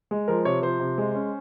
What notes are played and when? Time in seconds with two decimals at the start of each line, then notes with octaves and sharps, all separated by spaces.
0.11 G#3
0.28 F3 A#4
0.45 C3 C#5
0.62 F3 C5
0.80 C3
0.98 G#3
1.15 C#4